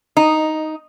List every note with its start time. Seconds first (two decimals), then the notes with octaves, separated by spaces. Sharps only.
0.17 D#4